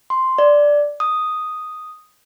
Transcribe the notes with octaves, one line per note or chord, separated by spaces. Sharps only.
C6
D5
D#6